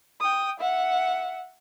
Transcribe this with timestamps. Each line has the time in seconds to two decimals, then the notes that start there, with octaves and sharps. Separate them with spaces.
0.21 G5 D#6
0.60 E5 F#5